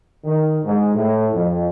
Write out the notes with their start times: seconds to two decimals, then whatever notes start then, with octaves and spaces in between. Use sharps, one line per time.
0.25 D#3
0.64 G#2
0.95 A2
1.33 F2